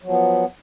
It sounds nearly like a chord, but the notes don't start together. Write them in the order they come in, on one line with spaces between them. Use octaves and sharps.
F#3 F3 B3